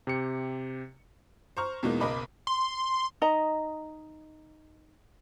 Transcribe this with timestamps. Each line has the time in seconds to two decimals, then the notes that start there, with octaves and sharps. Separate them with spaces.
0.07 C3 G4 C#7
1.57 C5 A#5 C#6 F6
1.83 E2 B2 E3 G#3 A#3 D#4
2.00 F#1 B1 A#4 D#5 B5 D6
2.47 C6
3.21 D#4 D#5 A#5